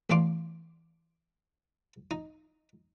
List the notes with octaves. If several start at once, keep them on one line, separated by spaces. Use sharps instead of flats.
A1 E2 D4 F5 C6 D6
D#4